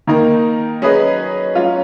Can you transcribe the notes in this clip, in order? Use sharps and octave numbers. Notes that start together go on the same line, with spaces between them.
D#3 A#3 D#4 A#4
F#3 C#4 G#4 B4 D#5
F#3 C#4 F4